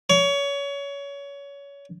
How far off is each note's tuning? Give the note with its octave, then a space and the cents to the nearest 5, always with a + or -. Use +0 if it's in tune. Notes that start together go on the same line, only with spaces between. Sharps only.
C#5 +25